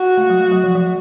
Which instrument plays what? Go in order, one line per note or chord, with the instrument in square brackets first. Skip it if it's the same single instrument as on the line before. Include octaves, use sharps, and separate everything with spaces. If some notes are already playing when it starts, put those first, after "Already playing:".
Already playing: [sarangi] F#4
[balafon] A3
F#3
A3
F#3
F3
F3